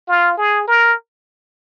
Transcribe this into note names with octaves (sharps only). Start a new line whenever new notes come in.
F4
G#4
A#4